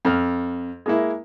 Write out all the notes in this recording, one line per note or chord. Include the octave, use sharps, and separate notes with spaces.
F2 F6
G#3 A#3 E4